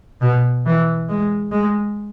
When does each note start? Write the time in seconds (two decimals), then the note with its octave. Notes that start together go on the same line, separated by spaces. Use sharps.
0.22 B2
0.65 E3
1.09 G#3
1.51 G#3